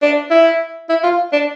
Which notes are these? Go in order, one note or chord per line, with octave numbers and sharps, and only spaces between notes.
D4
E4
E4
F4
D4